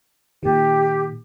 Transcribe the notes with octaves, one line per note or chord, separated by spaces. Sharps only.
A#2 D#3 G4